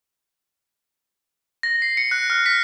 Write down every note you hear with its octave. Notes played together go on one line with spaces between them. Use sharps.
A#6
C7
C#7
F#6
F6
B6